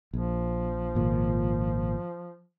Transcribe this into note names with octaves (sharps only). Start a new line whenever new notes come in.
A#1 F3
G#1 A#2